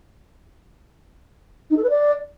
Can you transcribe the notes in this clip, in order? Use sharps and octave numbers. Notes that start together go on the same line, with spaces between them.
D#4
A4
B4
D5